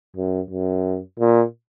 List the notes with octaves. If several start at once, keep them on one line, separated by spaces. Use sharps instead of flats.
F#2
F#2
A#2